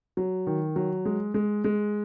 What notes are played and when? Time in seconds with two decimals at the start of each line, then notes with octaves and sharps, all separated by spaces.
0.17 F#3
0.47 D#3
0.76 F#3
1.05 G#3
1.34 G#3
1.64 G#3